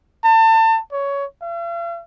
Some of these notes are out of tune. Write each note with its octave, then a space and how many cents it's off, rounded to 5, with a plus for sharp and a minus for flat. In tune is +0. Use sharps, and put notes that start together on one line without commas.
A5 +30
C#5 +15
F5 -45